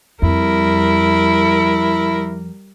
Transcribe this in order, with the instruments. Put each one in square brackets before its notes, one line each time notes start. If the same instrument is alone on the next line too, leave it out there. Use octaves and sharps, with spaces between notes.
[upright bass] F2 [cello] G3 A#4 [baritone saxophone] E4